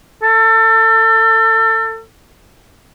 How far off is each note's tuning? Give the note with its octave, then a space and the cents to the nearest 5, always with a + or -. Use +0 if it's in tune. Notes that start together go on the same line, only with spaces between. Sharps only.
A4 +30